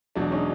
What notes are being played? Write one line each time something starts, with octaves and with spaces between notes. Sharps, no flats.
E1 E2 B2 F#3 D4
C#4 D#4